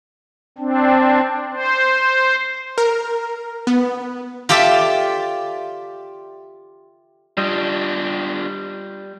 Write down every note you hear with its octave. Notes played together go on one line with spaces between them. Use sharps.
C4 D4
C5
A#4
B3
F4 G4 A4 D5 E5
G3 D4 F4 G4 D#5